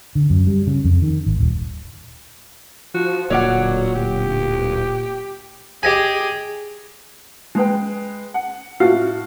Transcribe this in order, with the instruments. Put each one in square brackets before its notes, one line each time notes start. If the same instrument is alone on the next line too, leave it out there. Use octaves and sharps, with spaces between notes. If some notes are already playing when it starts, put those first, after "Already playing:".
[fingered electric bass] D3
F#2
G3
C#3
F2
D#3
G#1
D#1
[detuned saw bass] F3 [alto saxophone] F#4
[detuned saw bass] D1 [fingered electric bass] A#2 [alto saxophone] F#3 [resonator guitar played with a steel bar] C#5 D5 F#5
[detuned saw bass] D1 [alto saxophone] G4
[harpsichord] G4 D#5 G#5 [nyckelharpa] G#4
[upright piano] G#3 G#4 B4 G5
F#5
A2 F4 F#4 F6 C7